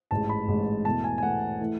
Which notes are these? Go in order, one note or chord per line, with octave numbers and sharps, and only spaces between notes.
A1 G#2 E3 G#3 A5
B5
A1 G#2 E3 G#3
E2 B2 A3 A5
G#5
G#5
E2 B2 A3 F#5
E3 A3